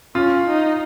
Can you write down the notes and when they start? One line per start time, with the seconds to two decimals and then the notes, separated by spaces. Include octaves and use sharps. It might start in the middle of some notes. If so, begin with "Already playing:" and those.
0.15 C#4 F4
0.47 D#4